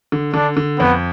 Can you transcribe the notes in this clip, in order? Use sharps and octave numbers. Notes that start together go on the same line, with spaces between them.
D3
D3 D4
D3
F2 B3